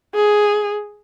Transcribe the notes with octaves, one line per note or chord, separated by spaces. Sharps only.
G#4